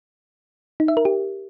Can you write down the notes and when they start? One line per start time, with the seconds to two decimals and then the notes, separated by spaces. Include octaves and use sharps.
0.80 D#4
0.88 E5
0.97 A#4
1.05 G4